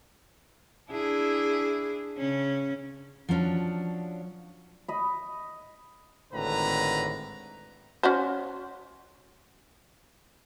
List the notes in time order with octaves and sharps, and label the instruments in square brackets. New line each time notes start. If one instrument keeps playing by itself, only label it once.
[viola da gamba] D4 E4 G#4
C#3 C#4
[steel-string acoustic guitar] F3 F#3 C#4 D4
[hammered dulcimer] D#5 B5
[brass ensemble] G#1 A2 D3 B4 A#5
[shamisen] C#4 F#4 C5